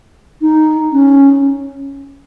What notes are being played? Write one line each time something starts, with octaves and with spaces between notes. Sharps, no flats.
D#4
C#4